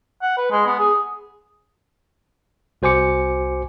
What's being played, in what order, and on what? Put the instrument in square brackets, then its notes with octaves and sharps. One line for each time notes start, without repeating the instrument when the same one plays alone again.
[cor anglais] F#5
B4
G#3
B3
G#4
[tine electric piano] C2 F#4 C5 G#5 D6 C#7